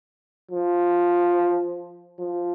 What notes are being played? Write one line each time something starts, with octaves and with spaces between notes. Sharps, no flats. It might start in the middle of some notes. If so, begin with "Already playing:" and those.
F3
F3